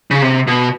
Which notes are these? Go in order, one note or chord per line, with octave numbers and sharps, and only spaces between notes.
C#3
C3
B2